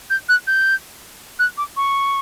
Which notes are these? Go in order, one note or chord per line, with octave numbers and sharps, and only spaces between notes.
G6
F#6
G6
F#6
D6
C#6